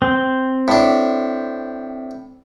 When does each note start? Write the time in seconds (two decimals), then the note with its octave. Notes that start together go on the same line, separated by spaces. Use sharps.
0.02 C4
0.68 A2 D4